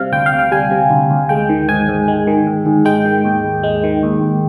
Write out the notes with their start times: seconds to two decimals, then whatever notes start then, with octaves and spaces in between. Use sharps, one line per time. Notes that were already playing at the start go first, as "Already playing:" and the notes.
Already playing: C3 G3 F5
0.12 D2 G5
0.26 F5
0.32 D2
0.39 G5
0.51 G3 G#5
0.71 C3
0.90 D2
1.10 D2
1.29 G#3 G5
1.49 D#3
1.69 G#2 G#5
1.89 G#2
2.08 G#3
2.27 D#3
2.47 G#2
2.66 G#2
2.85 G#3 G5
3.05 D#3
3.25 D#2
3.45 D#2
3.63 G#3
3.84 D#3
4.03 D#2
4.21 D#2